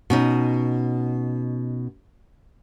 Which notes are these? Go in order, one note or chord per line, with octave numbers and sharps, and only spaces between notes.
B2 C#4 D#4